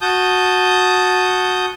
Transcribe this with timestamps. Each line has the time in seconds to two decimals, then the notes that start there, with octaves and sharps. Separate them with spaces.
0.01 F#4 A5 D#6 G6